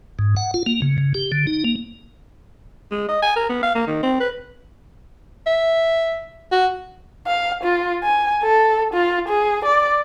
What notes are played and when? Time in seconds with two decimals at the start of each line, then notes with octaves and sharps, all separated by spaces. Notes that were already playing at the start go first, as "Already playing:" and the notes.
0.19 G#2
0.37 F#5
0.54 F4
0.66 A#3
0.82 C#3
0.98 C#3
1.14 G4
1.32 D3
1.47 D#4
1.64 A#3
2.91 G#3
3.09 D#5
3.22 G#5
3.36 A#4
3.49 B3
3.63 F5
3.75 A#3
3.87 D#3
4.03 C4
4.20 B4
5.46 E5
6.52 F#4
7.27 F5
7.64 F4
8.03 G#5
8.43 A4
8.94 F4
9.29 G#4
9.65 D5